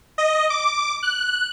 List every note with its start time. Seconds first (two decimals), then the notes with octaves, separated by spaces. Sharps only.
0.18 D#5
0.50 D6
1.03 F#6